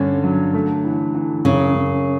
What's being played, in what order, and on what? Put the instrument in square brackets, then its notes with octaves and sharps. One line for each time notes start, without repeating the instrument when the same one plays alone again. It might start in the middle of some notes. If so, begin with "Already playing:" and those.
Already playing: [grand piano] G2 C#4 [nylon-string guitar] D3
[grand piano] F#3
A3
E3
E3
[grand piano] F#2 [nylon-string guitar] C#3
[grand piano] F#2